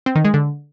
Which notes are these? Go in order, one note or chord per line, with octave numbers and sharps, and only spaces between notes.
C4
D#3
G#3
D3